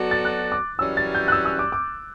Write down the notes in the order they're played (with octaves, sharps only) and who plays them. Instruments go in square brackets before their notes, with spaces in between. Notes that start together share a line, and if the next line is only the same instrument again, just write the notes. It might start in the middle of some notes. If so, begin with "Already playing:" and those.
Already playing: [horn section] F#3 B3 F#4 A4 D5
[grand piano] A6
F#6
D6
[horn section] F#2 E3 G3 C#4 [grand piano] E6
[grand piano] A6
G6
F#6
E6
E6
D6
D6